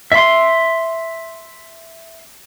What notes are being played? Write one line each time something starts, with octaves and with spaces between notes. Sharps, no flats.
E5 C6